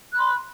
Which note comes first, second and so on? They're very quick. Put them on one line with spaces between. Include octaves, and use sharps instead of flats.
F#6 B5 C6